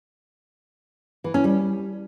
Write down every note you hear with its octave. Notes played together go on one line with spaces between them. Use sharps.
E3
C#4
G3